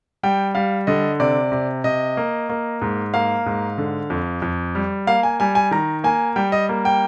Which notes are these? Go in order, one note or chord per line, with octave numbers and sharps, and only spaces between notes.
G3 G5
G3 F5
D3 D#5
C3 D5
C3
C3 D#5
A#3
A#3
G#2
A#3 F5
G#2
D3
F2
F2
G3
A#3 F5
G#5
G3 G#5
G#5
D#3 A#5
A#3 G#5
G3 G5
D#5
A#3
G5